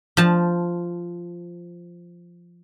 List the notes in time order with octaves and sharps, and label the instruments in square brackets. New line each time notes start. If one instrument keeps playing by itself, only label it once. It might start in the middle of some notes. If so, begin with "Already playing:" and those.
[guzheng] F3 A5